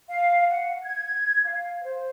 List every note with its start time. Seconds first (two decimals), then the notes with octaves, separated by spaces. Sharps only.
0.09 F5
0.49 F#5
0.83 G#6
1.46 F5
1.83 C5